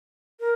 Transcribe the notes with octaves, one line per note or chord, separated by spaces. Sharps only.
A#4